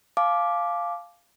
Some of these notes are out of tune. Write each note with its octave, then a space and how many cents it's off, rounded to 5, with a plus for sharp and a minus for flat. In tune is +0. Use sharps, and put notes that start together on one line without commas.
F5 +0 A5 -35 D6 +0